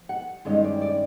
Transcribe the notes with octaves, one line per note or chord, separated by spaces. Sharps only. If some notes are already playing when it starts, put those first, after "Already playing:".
Already playing: F3
F#5
G2 D#3 G#3 C#4 E4 D#5
D5
D5